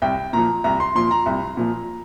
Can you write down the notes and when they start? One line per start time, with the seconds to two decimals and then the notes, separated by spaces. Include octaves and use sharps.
0.02 C2 G5
0.33 A#2 F3 A#5
0.64 C2 A#5
0.80 C6
0.95 A#2 F3 C6
1.11 A#5
1.26 C2
1.57 A#2 F3